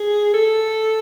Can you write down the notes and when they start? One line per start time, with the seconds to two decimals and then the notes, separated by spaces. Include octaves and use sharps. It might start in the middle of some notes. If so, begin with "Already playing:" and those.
Already playing: G#4
0.34 A4